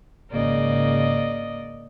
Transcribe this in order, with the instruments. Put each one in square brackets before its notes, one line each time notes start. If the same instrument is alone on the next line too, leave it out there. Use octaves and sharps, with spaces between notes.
[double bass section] G#1 C#3 [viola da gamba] A#3 D5 D#5